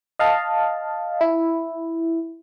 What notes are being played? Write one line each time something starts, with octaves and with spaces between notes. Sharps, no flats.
D#5 F5 A5
E4